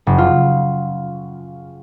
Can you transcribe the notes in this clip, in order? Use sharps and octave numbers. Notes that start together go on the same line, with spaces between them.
F#1
F4